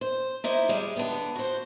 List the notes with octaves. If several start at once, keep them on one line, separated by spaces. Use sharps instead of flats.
C5
D#4 E4 C5 D5
G3 G#3
D3 B3
F#4 C5